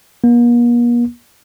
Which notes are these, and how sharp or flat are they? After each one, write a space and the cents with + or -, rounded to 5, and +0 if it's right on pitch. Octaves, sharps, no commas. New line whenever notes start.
A#3 +45